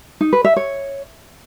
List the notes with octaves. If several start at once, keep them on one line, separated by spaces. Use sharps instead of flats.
D#4
B4
E5
C#5